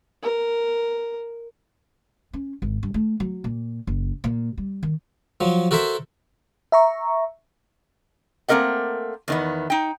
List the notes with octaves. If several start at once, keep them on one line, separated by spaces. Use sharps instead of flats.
A#4
C#4
G#1
G2
A3
F#3
A#2
F#1
A#2
G3
D#3
F3 F#3
F#4 A4 A#4 C5 E5
E5 A#5 C#6
A3 A#3 C4 A#4 D#5 F#5
E2 D#3 B3
D#4 G5